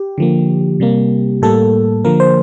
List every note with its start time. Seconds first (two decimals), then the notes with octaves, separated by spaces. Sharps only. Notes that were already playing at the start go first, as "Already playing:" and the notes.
Already playing: G4
0.18 D3 F3 A#3
0.80 C3 G3 A#3
1.42 A2 G3 A#3 A4
2.05 D3 F3 A#3 A#4
2.20 C5